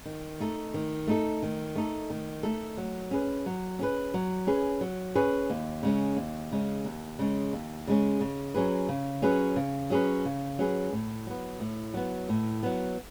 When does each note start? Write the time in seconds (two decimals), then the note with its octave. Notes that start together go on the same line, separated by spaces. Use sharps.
0.06 D#3
0.40 A3 D#4 A4
0.74 D#3
1.07 A3 D#4 A4
1.43 D#3
1.76 A3 D#4 A4
2.10 D#3
2.43 A3 D#4 A4
2.77 F#3
3.11 C#4 G#4 B4
3.46 F#3
3.79 C#4 G#4 B4
4.14 F#3
4.47 C#4 G#4 B4
4.81 F#3
5.15 C#4 G#4 B4
5.50 D#2
5.83 C#3 G#3 C#4
6.17 D#2
6.52 C#3 G#3 C#4
6.85 D#2
7.19 C#3 G#3 C#4
7.53 D#2
7.87 C#3 G#3 C#4
8.21 C#3
8.54 F#3 C#4 G#4 B4
8.89 C#3
9.22 F#3 C#4 G#4 B4
9.56 C#3
9.90 F#3 C#4 G#4 B4
10.25 C#3
10.59 F#3 C#4 G#4 B4
10.92 A2
11.26 F#3 B3
11.60 A2
11.94 F#3 B3
12.29 A2
12.63 F#3 B3